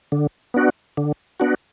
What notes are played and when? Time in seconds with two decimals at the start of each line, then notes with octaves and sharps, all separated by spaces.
0.12 D3
0.54 B3 D4 F#4
0.97 D3
1.40 B3 D4 F#4